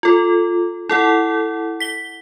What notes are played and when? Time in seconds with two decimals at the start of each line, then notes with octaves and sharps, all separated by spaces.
0.03 F4 A4
0.89 E4 A4 F#5
1.80 B6 G7